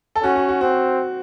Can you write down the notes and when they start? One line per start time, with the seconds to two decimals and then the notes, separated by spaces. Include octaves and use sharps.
0.16 A4
0.23 C#4 F#4
0.36 F#4
0.49 F#4
0.61 C4 F#4